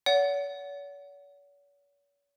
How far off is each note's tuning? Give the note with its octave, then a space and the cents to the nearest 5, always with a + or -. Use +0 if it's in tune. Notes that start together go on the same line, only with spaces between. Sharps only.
C#5 +45 F#5 +0